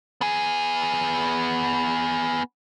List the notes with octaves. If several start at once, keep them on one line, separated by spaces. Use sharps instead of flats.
B3 G#4